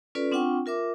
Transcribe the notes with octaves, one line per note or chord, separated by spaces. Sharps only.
C#4 F4 A4 B4 D5
C4 D4 F4 F#5 G5 C#6
F4 A#4 E5 D6